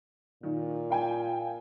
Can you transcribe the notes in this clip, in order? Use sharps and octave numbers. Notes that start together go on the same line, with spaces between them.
A#2 D#3
F5 G5 G#5